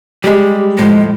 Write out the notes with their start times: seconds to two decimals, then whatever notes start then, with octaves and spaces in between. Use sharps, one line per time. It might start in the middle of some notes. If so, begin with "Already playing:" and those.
0.24 G3 G#3 G4
0.78 D#2 A2 F3 G#3